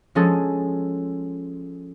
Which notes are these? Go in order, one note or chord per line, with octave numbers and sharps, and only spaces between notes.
F3 G#3 C#4 G#4 A4